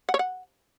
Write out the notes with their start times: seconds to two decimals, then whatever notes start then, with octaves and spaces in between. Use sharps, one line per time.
0.09 F#5
0.14 C#5
0.19 F#5